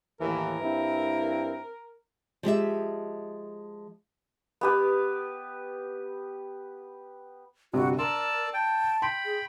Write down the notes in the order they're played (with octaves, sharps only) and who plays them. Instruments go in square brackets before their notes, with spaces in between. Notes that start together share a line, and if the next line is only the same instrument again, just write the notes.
[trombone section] D#2 A2 E3 [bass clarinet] A#4
[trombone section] G2 C4 E4
[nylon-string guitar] F3 G#3 G4 E5
[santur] B3 G4 B4
[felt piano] G1 C3 [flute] F#4
[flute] A#4 [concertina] D5 A5 E6 [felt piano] C6
[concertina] G5 [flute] A5
[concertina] G5 B5 [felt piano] C6
[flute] G#4